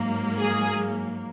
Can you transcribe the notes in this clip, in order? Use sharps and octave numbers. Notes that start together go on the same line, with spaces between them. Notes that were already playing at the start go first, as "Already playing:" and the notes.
Already playing: G#2 F#3 A#3
G#4